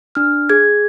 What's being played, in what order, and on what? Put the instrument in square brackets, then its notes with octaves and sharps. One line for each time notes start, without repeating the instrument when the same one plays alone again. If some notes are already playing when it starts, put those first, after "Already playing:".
[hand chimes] D4 F6
G#4 G#6